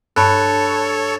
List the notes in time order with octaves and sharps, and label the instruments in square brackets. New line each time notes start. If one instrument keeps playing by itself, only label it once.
[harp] G2 [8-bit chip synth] A4 C#5 [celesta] A5 B5 F#6